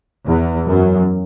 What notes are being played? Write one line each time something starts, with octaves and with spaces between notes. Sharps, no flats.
E2
F#2